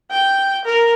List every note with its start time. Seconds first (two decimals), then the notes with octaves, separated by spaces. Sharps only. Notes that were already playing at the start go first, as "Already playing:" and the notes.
0.11 G5
0.65 A#4